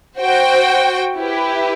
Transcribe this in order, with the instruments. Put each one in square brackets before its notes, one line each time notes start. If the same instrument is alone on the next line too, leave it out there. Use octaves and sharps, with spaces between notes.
[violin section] F#4 C5 G5
E4 G4 B4